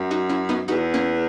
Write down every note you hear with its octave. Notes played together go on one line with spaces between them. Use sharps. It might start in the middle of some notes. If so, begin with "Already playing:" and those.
Already playing: F#2
D#4 F#4
C#4 E4
B3 D#4
E2 D#4 F#4
A#3 C#4